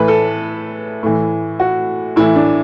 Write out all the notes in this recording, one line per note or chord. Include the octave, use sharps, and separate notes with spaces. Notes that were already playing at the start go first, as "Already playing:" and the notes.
Already playing: A2 E3 B4
A4
A2 E3
F#4
A2 E3 E4
D4